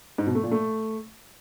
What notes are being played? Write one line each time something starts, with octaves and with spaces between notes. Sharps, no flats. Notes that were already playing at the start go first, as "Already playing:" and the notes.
G#2
B2
A3
A#2
A3